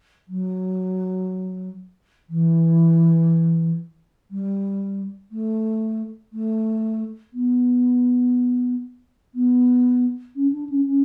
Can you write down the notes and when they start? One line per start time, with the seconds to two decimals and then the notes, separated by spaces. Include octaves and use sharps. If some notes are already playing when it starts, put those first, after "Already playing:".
0.28 F#3
2.29 E3
4.30 G3
5.31 A3
6.32 A3
7.33 B3
9.34 B3
10.35 C#4
10.52 D4
10.69 C#4
10.86 C#4